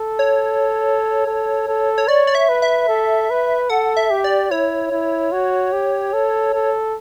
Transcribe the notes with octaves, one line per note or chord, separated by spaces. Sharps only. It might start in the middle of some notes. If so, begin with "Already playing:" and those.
Already playing: A4
C#5
A4
A4
C#5
C#5 D5
D5
E5
B4
E5
A4
B4
A4 F#5
E5
G4
D5
E4 C#5
E4
F#4
G4
A4
A4